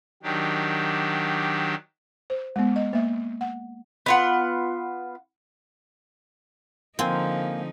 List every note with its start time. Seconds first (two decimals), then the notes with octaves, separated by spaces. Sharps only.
0.23 D#3 F#3 D4 G4
2.30 C5
2.56 G#3 B3
2.76 D#5
2.93 A#3 E5
3.41 F#5
4.06 B3 F4 F#5
6.99 D3 F3 A#3 C4 D#4 F5 G#5